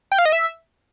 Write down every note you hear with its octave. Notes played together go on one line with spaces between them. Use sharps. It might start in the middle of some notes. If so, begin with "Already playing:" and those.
G5
F5
D#5
E5